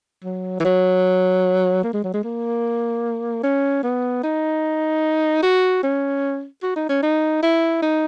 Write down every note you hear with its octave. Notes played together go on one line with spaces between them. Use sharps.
F#3
E3
F#3
A#3
G#3
F#3
G#3
A#3
C#4
B3
D#4
F#4
C#4
F#4
D#4
C#4
D#4
E4
D#4